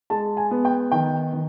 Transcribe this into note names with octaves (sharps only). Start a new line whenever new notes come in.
G#3 A5
G#5
B3
G5
D#3 G5
D#3